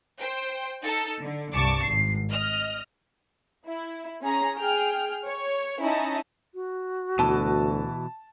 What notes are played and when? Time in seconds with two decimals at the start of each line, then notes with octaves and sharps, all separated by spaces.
0.19 C5 G5
0.83 D#4 A4
1.21 D3
1.54 C2 G2 A5 C#6 D6
1.84 G#1 C7
2.31 D#5 F6
3.66 E4
4.22 C#4 G#4 A#5
4.58 G#4 G5 F6
5.24 C#5
5.81 C#4 D#4 E4 D#5 A5
6.54 F#4
7.19 D2 B2 E3 A5